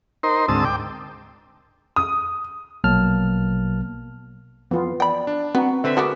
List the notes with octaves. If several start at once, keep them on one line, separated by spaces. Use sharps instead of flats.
D#4 A#4 C5 C6
D2 G#2 C4 A5 D#6 E6
G5 D6
D#6
A#1 B2 F#3 A#3 A5 F6
F2 E3 B3 F4
D5 G5 B5
D4
B3 C4 F#4 A#5
D3 C4 B4 E5
G#3 A3 B3 F#4 A#4 D6